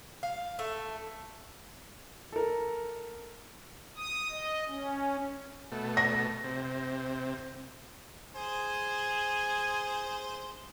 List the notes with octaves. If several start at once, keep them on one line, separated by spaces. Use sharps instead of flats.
F5
A3
A4 A#4
D#6
D#5
C#4
B2 A3
A#6
C3
G#4 C5 G#5